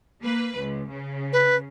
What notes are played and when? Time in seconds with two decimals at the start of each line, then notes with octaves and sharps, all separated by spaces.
0.22 A#3 B4
0.58 C#2
0.91 C#3
1.33 B4